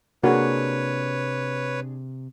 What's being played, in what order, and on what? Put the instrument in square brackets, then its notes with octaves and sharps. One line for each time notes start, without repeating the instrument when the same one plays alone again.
[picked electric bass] C3 [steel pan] A#3 F#4 A#4 [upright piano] D4 G#4 [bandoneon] B4 C#5